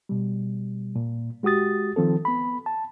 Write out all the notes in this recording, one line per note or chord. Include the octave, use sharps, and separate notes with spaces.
B2 G3
A#2
G#3 F#4 G4 D#6 A6
D#3 F3 C4 A4
B3 B5
A5